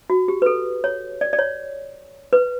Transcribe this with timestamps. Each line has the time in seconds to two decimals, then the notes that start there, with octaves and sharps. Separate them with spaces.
0.10 F#4
0.28 G4
0.42 B4
0.46 A4
0.84 C#5
1.21 D5
1.33 D5
1.39 C#5
2.33 B4